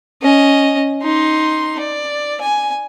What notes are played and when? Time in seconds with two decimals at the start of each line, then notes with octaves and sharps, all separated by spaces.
0.23 C#4 D#5
1.03 D#4 C6
1.79 D5
2.41 G#5